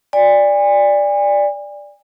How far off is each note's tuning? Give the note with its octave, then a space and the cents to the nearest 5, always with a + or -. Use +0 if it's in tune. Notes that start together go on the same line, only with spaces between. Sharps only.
D5 +0 G#5 -40